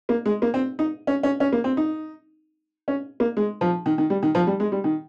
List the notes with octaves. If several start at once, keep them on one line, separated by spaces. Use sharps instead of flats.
A#3
G#3
A#3
C4
D#4
C#4
C#4
C#4
A#3
C4
D#4
C#4
A#3
G#3
F3
D#3
D#3
G3
D#3
F3
G3
G#3
G3
D#3